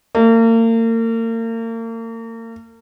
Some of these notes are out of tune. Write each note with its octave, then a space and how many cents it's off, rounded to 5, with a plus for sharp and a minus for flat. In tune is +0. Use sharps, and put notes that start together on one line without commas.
A#3 -40